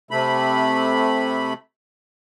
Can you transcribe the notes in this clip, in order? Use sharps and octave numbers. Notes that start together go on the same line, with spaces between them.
C3 A3 B5